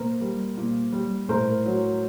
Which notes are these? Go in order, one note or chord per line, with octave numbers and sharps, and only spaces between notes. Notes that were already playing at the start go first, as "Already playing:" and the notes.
Already playing: A#2 A#4 C5
G3
A#2
G3
A2 A#4 C5
F#3